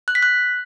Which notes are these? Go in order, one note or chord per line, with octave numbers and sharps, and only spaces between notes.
F#6
B6
F#6